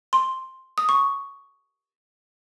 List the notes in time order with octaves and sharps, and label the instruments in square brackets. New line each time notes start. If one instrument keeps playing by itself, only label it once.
[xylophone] C6
D#6
C#6